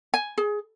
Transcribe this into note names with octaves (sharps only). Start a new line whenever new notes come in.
G#5
G#4